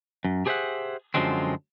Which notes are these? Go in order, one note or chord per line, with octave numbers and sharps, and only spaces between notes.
F#2
G4 G#4 C5 D#5 E5 F#5
F#2 D3 F3 F#3 G#3 C4